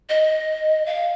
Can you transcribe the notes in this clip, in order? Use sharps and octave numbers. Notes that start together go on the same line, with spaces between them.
D#5
F5